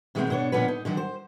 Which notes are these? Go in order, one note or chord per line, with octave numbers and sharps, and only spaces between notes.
B2 D#3 G#3 A3 B3 C4
B2 B3 D4 C#5
A#2 D3 F3 B3 C#4 B4
D#4
D3 D#3 F#3
C5